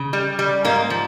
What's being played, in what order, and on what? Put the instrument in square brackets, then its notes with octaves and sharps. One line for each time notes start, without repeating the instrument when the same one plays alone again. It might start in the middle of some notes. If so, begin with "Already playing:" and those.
Already playing: [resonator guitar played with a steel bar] C#3
G3
G3
G#2 A#3
F3